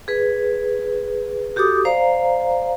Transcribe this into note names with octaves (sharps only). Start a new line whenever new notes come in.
G#4 B4
F#4 G4 A4 D6 D#6
C5 D5 F5 A#5